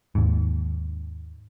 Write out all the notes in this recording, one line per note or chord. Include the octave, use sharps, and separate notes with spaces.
D#2 G#2